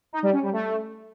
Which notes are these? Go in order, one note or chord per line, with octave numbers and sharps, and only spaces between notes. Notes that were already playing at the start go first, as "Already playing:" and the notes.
D#4
G3
C#4
G3
A3